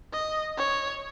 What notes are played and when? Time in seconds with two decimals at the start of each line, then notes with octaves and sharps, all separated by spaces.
0.13 D#5
0.58 C#5